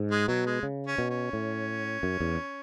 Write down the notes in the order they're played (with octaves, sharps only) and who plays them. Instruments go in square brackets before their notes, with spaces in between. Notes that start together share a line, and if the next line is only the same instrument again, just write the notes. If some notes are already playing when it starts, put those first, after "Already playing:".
Already playing: [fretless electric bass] G#2
[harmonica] G#3
[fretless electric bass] B2 [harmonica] F#3
[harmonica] G#3
[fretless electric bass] C#3
[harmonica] C#4
[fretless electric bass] B2
[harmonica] C#4
[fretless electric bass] A2
F#2
E2